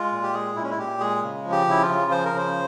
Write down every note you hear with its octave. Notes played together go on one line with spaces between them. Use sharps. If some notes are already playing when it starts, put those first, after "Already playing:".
Already playing: G#3 F4
A#2
G4
G#3 G#4
A#2 E4
C#4
E4
A#2 G4
G#3 G#4
C#3
F3
G4
C#3 E4
F4
C#3
F3 C5
A#4
C#3 C5